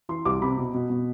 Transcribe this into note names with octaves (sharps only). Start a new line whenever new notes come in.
E3 C6
C2 D6
C3 B5
B2
B2
B2